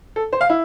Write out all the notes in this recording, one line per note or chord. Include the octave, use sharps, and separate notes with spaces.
A4
C5
F5
E4